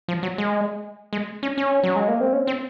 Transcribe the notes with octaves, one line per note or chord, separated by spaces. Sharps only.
F3
F#3
G#3
G#3
C#4
C#4
F#3
G#3
A#3
C4
C#4
C4